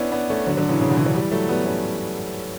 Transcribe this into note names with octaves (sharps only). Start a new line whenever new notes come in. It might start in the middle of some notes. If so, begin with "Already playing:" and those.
Already playing: B3 C#4 D4 E4
B3 D4
A3 C#4
D3 F#3
D3 F#3
C#3 E3
C#3
B2 D3
C#3 E3
D3 F#3
E3 G3
F#3 A3
G3 B3
A3 C#4